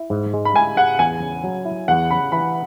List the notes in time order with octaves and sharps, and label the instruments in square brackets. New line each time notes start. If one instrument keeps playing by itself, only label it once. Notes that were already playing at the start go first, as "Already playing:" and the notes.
Already playing: [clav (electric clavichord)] E4
G#2
G#3
[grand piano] B5
[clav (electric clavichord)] E4 [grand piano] G#5
[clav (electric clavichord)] G#4 [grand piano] F#5
[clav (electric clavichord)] E2 [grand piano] G#5
[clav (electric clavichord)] C#3
F#3
E4
[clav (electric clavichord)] E2 [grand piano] F#5
[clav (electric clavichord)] C#3 [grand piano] B5
[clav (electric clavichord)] E3 [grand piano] B5